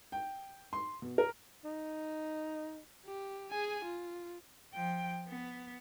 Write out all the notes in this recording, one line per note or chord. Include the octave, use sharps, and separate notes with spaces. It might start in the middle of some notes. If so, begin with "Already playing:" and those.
G5
C6
B2
A#4
D#4
G4
G#4 G#5
F4
F3 G5
B3